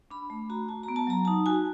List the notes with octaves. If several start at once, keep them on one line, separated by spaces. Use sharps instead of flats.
D4 B5
A3 B5
F#4 A#5
F#4 A5
A#5
B3
A5
F#3 A#5
D#4 A5
F#4 G#5